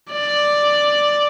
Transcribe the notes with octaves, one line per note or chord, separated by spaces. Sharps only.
D5